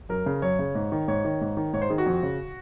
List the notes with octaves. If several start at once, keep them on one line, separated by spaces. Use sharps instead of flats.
F#2 A#4
C#3
F#2 C#5
C#3
G#2
D#3
G#2 C#5
D#3
G#2
D#3
G#2 C#5
C5
D#3 G#4
F#4
F2
C#3